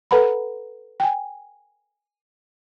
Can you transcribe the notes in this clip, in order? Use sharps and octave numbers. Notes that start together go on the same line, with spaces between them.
A4 B4 F#5 A#5 B5
G5 G#5